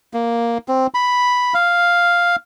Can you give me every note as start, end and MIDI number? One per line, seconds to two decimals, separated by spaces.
0.14 0.58 58
0.68 0.87 60
0.94 1.54 83
1.54 2.36 77